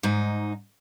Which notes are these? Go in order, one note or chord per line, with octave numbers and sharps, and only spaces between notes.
G#2 D#4